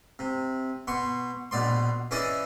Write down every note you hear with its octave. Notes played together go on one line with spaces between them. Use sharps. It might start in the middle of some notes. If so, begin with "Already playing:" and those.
C3
B2 C6 C#6
A#1 B2 D5 C6
E3 C#4 E4 G#4 D5 D#5